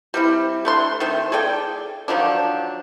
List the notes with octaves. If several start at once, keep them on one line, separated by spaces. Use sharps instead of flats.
G3 C4 E4
A3 D4 C6
D#3 A3 C4
G#4 A4 D5 G5
D#3 F3 F#3 D4